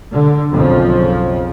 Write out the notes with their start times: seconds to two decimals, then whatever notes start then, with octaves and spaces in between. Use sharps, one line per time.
0.12 D3
0.52 B1 F2 C#3 F3